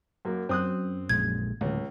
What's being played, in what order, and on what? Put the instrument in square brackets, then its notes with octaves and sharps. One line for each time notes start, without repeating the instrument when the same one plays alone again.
[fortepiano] F#2 A#3
[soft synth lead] F#2 [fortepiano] C4 D#6 F#6
[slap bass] A#1 G#3 [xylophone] G#6
[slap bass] D1 [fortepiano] C#2